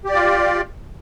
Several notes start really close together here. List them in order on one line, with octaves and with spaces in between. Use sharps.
G4 D5 F4